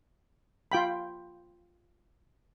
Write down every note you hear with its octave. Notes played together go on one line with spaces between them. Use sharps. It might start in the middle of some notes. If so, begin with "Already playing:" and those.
F4 G5 B5